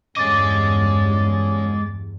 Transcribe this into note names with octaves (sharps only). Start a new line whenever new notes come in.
E2 G2 D3 G#3 C#4 D#5 D6 A6